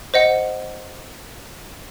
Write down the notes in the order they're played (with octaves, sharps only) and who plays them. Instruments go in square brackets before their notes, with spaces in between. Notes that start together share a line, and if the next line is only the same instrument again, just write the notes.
[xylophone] C5 D#5 F#5